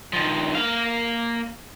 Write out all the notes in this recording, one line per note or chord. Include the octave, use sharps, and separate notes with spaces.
D#3 F3
A#3 F5